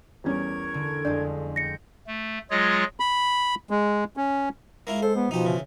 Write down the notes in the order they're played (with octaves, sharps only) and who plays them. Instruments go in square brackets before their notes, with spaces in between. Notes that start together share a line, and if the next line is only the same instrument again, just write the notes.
[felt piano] E2 G3 C#4 [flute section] A#4 C#6 G#6
[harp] D3
[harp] F2 F3 G#3 [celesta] D4 D5
[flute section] G5 G6 [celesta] A#6 C#7
[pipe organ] A3
F#3 G#3 F4 G#4 C#5 D#5
[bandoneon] B5
G#3
C#4
[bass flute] G#3 [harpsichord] A#3 E4 F4
[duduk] A4 [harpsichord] C5
[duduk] B3
[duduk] B2 [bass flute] F3 [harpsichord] D#4 G4
[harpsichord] C#3 E3